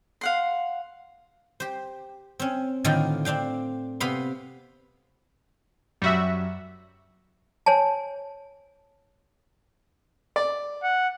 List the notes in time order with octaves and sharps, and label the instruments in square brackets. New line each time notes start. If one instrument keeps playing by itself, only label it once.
[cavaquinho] F5 F#5 C6
[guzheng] G4 C5
C4 C#4
A2 D3 D#3 D4 F4 G5
C4 D4 F5 G5
C3 B3 F5 B5 C6
[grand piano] F#2 [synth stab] G3 F#4 E5
[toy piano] C5 C#5 G#5 A5
[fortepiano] D5
[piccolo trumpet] F#5